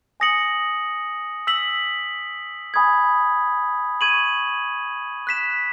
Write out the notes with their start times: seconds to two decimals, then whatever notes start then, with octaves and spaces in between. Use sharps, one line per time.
0.20 G#5 D#6 A#6 C#7 F#7
1.47 E6 B6 F#7
2.74 G#5 B5 D#6 G#6
4.01 C#6 G#6 D#7 F#7
5.27 F#6 B6 E7